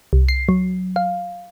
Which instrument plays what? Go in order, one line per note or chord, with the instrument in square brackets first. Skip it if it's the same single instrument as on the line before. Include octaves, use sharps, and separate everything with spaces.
[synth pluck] C2
C7
F#3
F5